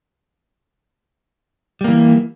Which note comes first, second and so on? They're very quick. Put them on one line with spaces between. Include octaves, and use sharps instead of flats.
G3 A#3 E3